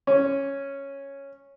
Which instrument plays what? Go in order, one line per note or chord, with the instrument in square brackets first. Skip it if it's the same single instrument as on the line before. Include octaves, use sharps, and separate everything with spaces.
[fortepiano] C#4